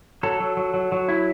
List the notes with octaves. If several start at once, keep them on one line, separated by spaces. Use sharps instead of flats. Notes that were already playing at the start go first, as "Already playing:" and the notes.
F#3 A4
F#3
F#3
F#3
F#3
E4